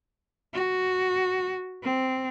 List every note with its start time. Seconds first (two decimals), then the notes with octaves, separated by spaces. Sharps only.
0.54 F#4
1.83 C4